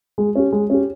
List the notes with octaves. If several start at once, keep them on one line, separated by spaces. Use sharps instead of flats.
G#3
C#4 G4
G#3
C#4 G4